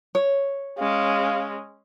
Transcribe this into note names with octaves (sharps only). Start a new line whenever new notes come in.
C#5
G#3 C#4 F5